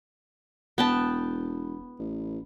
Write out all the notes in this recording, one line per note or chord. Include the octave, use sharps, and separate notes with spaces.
E1 B3 G5 A5
A1